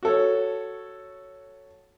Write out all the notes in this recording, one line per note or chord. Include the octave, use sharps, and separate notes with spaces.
F#4 A4 C#5